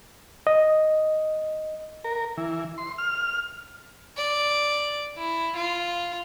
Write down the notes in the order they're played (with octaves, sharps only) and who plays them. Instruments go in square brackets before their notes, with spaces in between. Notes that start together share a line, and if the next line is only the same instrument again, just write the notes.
[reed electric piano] D#5
[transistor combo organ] A#4
E3
C6
F6
[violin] D5
E4
F4